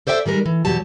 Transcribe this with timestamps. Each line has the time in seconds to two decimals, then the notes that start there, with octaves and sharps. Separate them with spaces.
0.07 A4 C5 D5 E5 G5
0.26 D#3 G3 G#3 A#4
0.46 E3
0.65 E2 B2 F#3 G4 C#5 A5